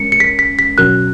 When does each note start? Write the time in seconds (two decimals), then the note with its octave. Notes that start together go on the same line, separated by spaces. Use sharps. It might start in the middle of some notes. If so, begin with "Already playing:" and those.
Already playing: G#3 C#4 A#4 C#7
0.12 C#7
0.20 B6
0.39 B6
0.59 B6
0.78 B2 F#3 C#4 F#4 A#4 F#6